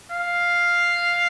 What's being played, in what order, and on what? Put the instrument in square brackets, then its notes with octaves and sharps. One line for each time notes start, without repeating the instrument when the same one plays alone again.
[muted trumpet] F5